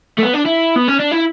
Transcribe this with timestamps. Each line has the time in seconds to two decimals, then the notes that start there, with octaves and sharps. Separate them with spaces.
0.18 A3
0.23 B3
0.33 D4
0.45 E4
0.76 B3
0.88 C#4
1.00 D4
1.12 E4